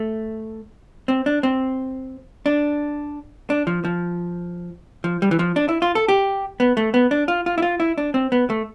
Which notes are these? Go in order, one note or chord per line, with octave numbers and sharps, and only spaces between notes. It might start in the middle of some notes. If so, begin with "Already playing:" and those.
Already playing: A3
C4
D4
C4
D4
D4
F3
F3
F3
G3
E3
F3
D4
E4
F4
A4
G4
B3
A3
B3
D4
F4
F4
E4
F4
E4
D4
C4
B3
A3